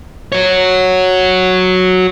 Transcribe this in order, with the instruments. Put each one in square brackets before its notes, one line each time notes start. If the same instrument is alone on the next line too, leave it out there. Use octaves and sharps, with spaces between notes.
[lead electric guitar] F#4 C#5